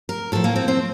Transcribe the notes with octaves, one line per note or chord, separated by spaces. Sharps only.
A#4
A2 F3 A4
A#3
C4
C4